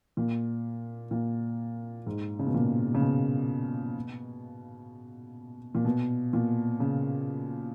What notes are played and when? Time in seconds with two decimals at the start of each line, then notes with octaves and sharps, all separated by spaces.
0.17 A#2
1.11 A#2
2.06 G#2
2.39 C#3
2.47 B2
2.54 A#2
2.95 C#3
3.01 B2
5.75 A#2
5.85 B2
6.33 A#2
6.80 C#3